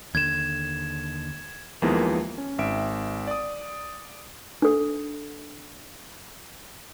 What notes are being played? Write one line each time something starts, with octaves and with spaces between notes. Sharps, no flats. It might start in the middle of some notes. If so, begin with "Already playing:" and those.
D#2 D3 G#6 E7
D#2 E3 F3 G#3 A#3 B3
C#4
G#1 E5 G5 D7
D5 D#6
D4 A4